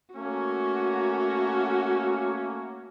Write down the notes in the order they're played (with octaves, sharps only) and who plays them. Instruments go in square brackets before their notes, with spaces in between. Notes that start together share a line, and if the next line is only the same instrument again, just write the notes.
[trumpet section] A3 A#3 C#4 [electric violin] F#4